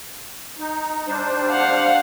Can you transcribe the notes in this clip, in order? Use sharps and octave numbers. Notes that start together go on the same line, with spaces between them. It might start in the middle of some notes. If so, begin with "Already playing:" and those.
D#4
G3 D4 C5
F5 F#5